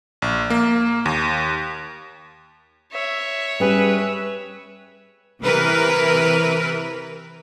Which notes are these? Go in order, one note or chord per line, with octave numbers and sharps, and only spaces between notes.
A#1
A#3
D#2
C#5 E5
G3 C#4 G#4 B4
C3 E3 A#4 B4